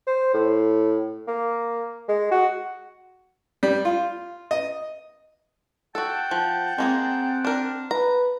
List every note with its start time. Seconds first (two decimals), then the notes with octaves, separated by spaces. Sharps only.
0.07 C5
0.34 A2
1.28 A#3
2.09 G#3
2.31 F#4
3.63 G3
3.85 F4
4.51 D#5
5.95 F#4 A4 F#5 G5 A5
6.31 F3
6.78 G#3 A#3 C4 G#4
7.45 D4 A#4
7.91 B4 A#5